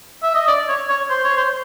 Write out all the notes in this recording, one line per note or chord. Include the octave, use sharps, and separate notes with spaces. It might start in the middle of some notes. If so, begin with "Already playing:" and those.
E5
D#5
D5
C#5
C#5
C5
C#5
C5